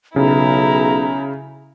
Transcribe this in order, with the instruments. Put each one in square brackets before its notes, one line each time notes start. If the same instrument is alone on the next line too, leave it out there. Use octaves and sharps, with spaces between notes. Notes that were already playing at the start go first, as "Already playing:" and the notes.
[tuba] B1 [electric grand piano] C#3 [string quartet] E4 [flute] A#5